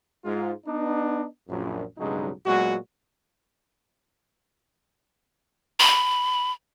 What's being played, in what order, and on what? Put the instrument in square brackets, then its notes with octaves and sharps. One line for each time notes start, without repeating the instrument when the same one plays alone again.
[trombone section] G#2 F4
B3 D4 D#4
A#1 F#2 A#2
B1 G2 C#3 F#3 G#3 D#4
A#2 F#3 G#3 B3 F#4
[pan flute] B5